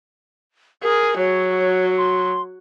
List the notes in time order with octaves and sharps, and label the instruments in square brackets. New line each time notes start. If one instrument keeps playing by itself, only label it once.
[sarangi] G#4 [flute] A#4
[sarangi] F#3 [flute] C#5
[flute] C6